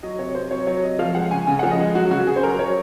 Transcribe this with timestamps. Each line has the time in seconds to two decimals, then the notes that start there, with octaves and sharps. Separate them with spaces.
0.03 F#3 D#5
0.19 C3 C#5
0.35 C3 C5
0.51 F#3 C#5
0.67 F#3 C#5
0.83 C3 D#5
0.99 F3 F5
1.15 G#3 F#5
1.31 C#3 G#5
1.47 C#3 G#5
1.59 F3 F#5
1.71 D#5
1.79 G#3
1.95 F#3 F#4
2.11 C#3 F#4
2.26 C#3 G#4
2.36 C5
2.43 F#3 A#4
2.59 F#3 C#5